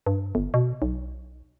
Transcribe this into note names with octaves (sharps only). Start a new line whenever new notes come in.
G2
G1
B2
B1